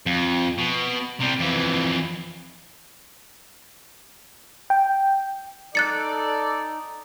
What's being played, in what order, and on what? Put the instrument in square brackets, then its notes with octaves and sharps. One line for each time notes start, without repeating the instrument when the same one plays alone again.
[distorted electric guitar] F2
B2
C3 G3
F2 E3
[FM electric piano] G5
[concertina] D#4 [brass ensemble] A4 D5 [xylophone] F#6 A6 C#7